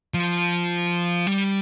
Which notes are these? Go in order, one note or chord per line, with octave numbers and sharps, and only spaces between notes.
F3
G3